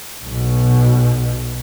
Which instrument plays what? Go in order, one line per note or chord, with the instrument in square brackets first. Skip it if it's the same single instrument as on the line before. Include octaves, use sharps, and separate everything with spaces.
[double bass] B1 B2